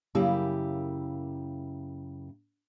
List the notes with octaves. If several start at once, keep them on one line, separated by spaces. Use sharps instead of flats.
F#2 C#3 A#3 E4 G4 E5